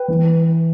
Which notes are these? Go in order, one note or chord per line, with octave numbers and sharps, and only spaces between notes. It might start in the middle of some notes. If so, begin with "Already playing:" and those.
Already playing: B4 G5
E3